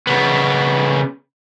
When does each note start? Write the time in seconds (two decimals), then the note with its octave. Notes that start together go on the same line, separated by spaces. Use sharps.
0.07 C#3 B3